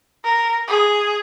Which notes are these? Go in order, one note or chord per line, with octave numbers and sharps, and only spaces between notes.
A#4
G#4